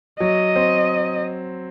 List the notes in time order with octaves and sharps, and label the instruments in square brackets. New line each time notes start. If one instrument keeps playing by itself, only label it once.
[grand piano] F#3 [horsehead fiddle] D#5
[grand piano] C4